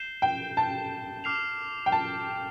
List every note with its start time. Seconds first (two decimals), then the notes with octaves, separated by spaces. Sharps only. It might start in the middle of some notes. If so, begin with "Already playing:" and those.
Already playing: G6 C7 E7 G7
0.22 G5
0.57 A5
1.24 D6 F6 C7 F7
1.86 G5
1.92 A5